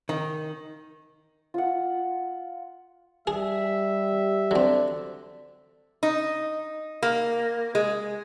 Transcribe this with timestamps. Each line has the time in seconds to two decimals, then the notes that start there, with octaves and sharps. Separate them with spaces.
0.09 D#3
1.54 F4 F#5
3.27 G3 G#4 E5
4.51 D3 F#3 C4
6.03 D#4
7.02 A#3
7.75 G#3